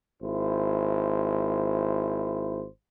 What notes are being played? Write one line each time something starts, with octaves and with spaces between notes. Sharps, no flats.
G#1 E4 C5